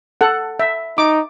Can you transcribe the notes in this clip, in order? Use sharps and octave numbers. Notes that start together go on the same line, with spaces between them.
A4 F#5
E5
D#4 D6